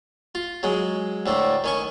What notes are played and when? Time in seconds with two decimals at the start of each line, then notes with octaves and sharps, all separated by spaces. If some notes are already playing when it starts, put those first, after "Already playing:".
0.35 F4
0.63 F#3 G#3
1.26 D2 A2 A3
1.64 D#3 C#4 C#6